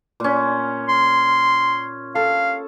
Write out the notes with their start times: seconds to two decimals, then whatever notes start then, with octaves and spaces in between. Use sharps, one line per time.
0.20 A#2 C#4
0.89 C6
2.15 A4 F5